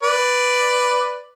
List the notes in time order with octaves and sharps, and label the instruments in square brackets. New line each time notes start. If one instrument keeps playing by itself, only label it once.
[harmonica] B4 D5